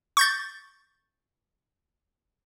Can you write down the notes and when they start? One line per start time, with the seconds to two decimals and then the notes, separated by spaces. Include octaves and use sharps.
0.17 C#6 G6 A6